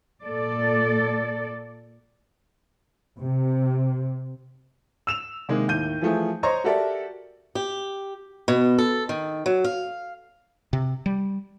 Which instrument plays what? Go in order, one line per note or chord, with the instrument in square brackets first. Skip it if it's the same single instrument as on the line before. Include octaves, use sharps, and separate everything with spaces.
[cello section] A#2 A4 D5
[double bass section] C3
[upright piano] E6 E7 F7
C3 D#3 G#3 A#3
D#2 A2 G6 D#7
E3 F3 A3 G#4
C5 C#5 D#5 A#5 C6 C#6
F#4 G4 A4 A#4 D5 E5
[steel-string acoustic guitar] G4
B2
A4
D#3
F#3
F5
[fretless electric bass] C3
G3